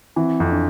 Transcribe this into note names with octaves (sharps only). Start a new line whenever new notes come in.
E3 C4
F2
D4